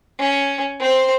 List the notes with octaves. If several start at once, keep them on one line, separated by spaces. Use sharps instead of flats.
C#4
C4 C5